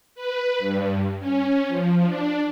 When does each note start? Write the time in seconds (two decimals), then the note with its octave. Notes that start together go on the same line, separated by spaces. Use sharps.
0.15 B4
0.59 G2
1.20 C#4
1.68 F3
2.06 D4